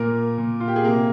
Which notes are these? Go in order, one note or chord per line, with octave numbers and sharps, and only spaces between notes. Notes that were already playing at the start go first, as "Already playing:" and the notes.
Already playing: A#2 A#3 A#4
A#2
F4
G4
G#4
C3 A#3 A#4